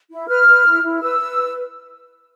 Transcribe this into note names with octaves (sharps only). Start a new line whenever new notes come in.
E4
B4 F6
B4
E4
E4
B4 E6
B4